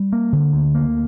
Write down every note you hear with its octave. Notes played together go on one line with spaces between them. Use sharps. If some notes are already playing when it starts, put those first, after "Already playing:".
Already playing: G3
A#3
D3
D2
A#3